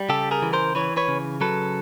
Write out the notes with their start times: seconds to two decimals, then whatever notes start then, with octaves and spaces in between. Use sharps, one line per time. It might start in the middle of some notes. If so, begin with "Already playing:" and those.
Already playing: G3
0.09 C#3 G4 A4
0.31 G#4 A#4
0.42 E3
0.53 A#4 C5
0.75 E3 B4 C#5
0.97 B4 C#5
1.08 C#3
1.41 F#3 A4 B4